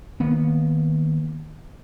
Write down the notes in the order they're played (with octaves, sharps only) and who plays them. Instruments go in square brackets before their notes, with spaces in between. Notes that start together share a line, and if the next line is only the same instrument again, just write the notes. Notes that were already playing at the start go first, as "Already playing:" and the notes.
[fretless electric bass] D#3 A#3 B3